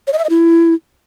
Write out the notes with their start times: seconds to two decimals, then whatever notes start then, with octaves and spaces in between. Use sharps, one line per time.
0.07 C#5
0.13 D#5
0.18 E5
0.24 D#5
0.30 E4